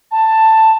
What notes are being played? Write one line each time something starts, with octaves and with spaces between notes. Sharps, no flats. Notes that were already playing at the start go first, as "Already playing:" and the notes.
A5